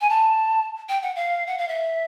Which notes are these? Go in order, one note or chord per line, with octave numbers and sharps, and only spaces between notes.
G#5
A5
G5
F#5
F5
F#5
F5
E5